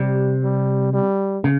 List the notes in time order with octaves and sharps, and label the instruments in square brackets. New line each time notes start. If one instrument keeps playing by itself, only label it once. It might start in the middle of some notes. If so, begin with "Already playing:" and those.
Already playing: [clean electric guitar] C3 [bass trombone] G3
[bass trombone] G3
G3
[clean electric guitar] C#3